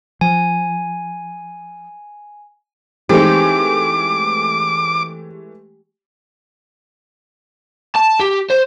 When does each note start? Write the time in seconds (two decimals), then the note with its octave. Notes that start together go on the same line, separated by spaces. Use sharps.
0.21 F3 G#5
3.09 E3 G#3 A3 C4 D#4 G4 D6
7.95 A5
8.20 G4
8.50 C5